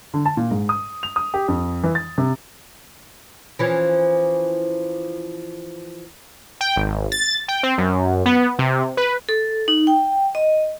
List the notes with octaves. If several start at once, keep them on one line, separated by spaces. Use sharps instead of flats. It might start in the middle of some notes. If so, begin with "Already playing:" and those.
D3
A5
A#2
G#2
D#6
F7
D#6
G4
F2
E3
A6
C3
E3 F3 C#4
G5
G#1
A6
G5
C4
F#2
B3
C3
B4
A4
D#4
G5
D#5